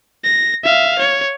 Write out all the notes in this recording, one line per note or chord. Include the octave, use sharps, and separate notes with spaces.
A#6
E5 F5
C#5